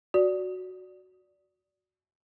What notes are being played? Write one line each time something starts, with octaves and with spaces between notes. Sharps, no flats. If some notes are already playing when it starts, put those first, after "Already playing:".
F#4 D5